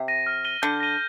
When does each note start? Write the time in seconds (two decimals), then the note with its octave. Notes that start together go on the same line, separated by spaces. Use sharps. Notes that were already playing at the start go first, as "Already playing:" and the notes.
Already playing: C3
0.08 A#6 D#7
0.26 F6
0.45 A#6 D#7 G7
0.62 D3 G6
0.80 A#6 D#7 G7